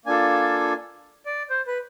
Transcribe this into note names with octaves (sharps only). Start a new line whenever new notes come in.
A#3 D4 F4 A4 G#5
D5
C5
B4